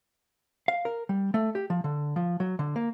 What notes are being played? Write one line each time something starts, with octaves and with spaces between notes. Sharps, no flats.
F5
A#4
G3
A3
G4
F3
D3
F3
F#3
D3
A#3